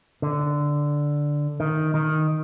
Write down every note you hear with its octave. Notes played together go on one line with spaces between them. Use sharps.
D3
D#3
D#3